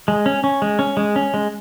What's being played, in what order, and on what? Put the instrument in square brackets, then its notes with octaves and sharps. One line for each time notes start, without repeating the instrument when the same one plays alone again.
[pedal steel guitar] G#3
C#4
C#4
G#3
C#4
G#3
C#4
G#3